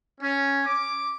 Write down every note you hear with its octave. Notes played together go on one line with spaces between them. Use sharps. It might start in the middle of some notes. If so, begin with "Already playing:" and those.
C#4
D6